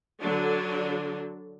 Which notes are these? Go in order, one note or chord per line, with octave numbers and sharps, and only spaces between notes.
D3 F#3 D4